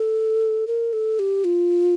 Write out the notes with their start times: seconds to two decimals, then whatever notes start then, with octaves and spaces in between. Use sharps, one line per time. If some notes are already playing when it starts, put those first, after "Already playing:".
Already playing: A4
0.67 A#4
0.93 A4
1.19 G4
1.44 F4